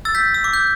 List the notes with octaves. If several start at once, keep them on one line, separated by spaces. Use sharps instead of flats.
E6 A6
G6 B6
E6
D6
G6